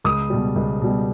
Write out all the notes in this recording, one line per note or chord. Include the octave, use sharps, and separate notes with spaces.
C#2 D#6
B2 G3
C#2
B2 G3